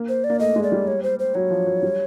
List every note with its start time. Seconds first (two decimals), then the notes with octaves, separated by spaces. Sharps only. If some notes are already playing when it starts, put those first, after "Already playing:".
Already playing: A#3
0.09 C5
0.24 D5
0.30 A#3
0.39 A3 D#5
0.56 G#3
0.63 D5
0.72 G3
0.87 C#5
1.03 C5
1.19 C5
1.35 F#3 C#5
1.51 F3
1.67 F#3
1.83 G3